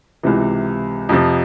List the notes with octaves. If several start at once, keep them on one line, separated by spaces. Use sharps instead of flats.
C#2 C3 E3
F2 C3 F3